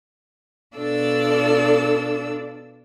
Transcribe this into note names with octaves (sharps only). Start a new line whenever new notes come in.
B2 D4 F4 A4 D5 E6